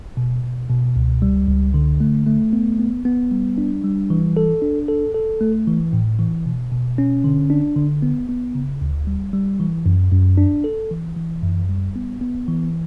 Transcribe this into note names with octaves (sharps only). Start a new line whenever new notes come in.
B2
B2
B2
C#2
G3
C#2
D3
A3
A3
B3
B3
B3
G3
D4
G3
E3
A4
D4
A4
A4
A3
E3
A2
E3
B2
B2
C#4
D3
D4
D3
B3
B3
C#3
D2
G3
G3
E3
F#2
F#2
D4
A4
E3
E3
F#2
G3
B3
B3
E3